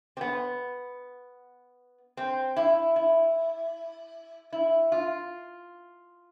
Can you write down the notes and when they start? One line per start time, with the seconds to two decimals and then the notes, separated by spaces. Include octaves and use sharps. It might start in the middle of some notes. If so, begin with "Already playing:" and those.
0.17 C4
0.21 B3
2.17 C4
2.56 E4
2.96 E4
4.53 E4
4.92 F4